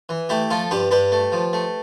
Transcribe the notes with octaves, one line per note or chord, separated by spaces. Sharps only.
E3
A3 E4 G4
F3 F4 A4
G2 G4 B4
G2 G4 B4
A3
F3
A3